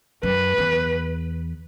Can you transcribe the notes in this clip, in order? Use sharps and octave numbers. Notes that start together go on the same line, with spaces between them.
F#2 B4
E2